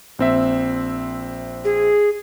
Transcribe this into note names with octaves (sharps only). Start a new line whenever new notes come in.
A#1 C4 E5
G#4